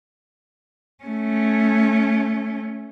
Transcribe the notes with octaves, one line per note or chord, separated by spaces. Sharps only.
A3 C#4